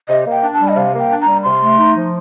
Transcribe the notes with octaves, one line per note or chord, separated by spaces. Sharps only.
C3 D#5
A#3 G5
D4
A5
G3
D#5
C3 F5
A#3
G5
D4
A#5
G3
C3 C6
A3
D#4
F3